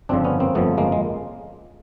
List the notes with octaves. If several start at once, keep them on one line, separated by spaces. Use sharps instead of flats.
G1 F2 C#3 F3 C4 D4
B3 C#4
A#3 C4
G1 F2 C#3 F3 A3 B3
G#3 A#3
G#3